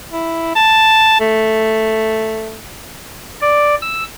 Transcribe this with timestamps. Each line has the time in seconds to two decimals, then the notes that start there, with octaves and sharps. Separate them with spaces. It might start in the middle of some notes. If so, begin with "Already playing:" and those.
0.11 E4
0.55 A5
1.20 A3
3.41 D5
3.81 E6